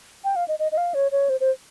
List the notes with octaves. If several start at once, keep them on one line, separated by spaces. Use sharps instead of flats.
G5
F5
D#5
D#5
D#5
F5
C#5
C#5
C5
C5